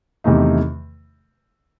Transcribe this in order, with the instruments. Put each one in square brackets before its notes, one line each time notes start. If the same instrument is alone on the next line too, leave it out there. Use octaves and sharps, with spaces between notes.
[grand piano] E2 C3 D#3 A3 D#4